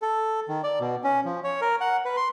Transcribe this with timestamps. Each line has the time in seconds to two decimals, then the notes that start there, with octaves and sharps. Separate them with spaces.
0.02 A4
0.48 D#3
0.63 D5
0.80 B2
1.04 C#4
1.25 F3
1.44 C#5
1.61 A#4
1.81 F#5
2.05 B4
2.17 C6